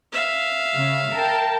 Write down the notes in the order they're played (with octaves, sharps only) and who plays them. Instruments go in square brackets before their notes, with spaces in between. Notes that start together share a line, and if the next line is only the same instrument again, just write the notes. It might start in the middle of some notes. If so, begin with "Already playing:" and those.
[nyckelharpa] E5 F5
[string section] C#3
A#4 G5 A5